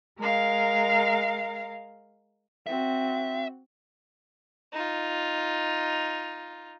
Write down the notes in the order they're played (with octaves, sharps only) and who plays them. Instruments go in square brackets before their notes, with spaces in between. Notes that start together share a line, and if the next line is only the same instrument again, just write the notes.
[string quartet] G#3 A#4 F5
[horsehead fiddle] C4 F#4 [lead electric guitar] E5
[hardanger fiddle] D#4 F4